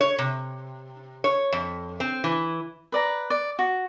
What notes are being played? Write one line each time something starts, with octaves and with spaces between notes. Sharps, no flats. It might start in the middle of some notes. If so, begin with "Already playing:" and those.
C#5
C3
C#5
F2
C4
E3
B4 D5 A#5
D5
F#4